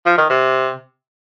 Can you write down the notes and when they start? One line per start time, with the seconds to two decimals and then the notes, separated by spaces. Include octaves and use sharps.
0.06 F3
0.18 D#3
0.30 C3